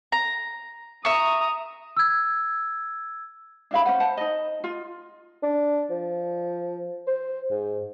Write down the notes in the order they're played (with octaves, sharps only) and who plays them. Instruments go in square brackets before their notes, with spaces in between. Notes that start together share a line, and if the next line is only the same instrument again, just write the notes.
[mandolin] A#5
[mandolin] E5 C#6 [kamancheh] A#5 D#6
[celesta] E6 G#6
[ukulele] D4 E4 F5 B5
C#4 D#4 C5 F#5
C5 F#5 A5
D#4 D#5
F4
[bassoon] D4
F3
C5
G#2